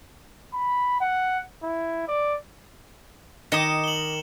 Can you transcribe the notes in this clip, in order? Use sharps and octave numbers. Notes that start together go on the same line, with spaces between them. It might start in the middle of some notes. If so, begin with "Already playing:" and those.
B5
F#5
E4
D5
D#3 D#5 D6 D#6 C#7 E7
F#7 G7